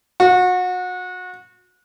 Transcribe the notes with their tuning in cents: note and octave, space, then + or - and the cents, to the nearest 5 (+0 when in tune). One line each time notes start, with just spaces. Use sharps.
F#4 -30